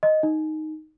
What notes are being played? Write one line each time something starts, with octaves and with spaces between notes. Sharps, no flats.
D#5
D#4